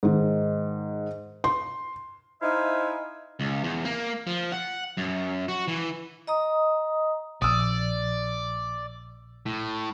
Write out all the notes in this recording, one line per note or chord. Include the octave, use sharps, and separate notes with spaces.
G#2 D#3
C6
D#4 E4 C5 E5 F5 G#5
C#2
E2
A#3
F3
F#5
F#2
F#4
E3
D#5 A#5 D#6
A#1 D5 D#6 E6
A2